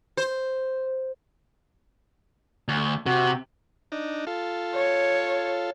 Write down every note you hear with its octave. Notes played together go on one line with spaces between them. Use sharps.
C5
D2
C3 F#4
D4 D#4
F4 A4
C#5